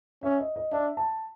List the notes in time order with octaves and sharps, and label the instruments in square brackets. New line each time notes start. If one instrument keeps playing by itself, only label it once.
[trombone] C#4 [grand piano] E5
[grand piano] D#5
D#5
[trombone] D4 [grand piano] E5
[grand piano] A5